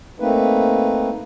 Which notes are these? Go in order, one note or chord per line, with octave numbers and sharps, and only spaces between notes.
A3 A#3 C4 D#4 B4